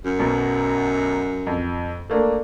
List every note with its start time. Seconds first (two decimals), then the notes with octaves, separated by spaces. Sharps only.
0.05 F#2
0.19 B1 B2
1.47 F2
2.10 A3 A#3 D4